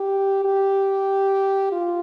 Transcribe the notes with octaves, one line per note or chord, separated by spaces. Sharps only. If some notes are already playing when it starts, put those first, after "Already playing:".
Already playing: G4
G4
F4